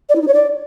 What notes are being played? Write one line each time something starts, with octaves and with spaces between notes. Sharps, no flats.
D5
E4
D#4
C#5
D5